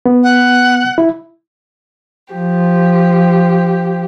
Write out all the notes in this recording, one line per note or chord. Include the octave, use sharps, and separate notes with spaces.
B3
F#5
E4
F3 G4